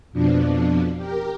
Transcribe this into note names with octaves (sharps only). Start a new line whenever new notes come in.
F2 B2 F3 D4
G4 A#4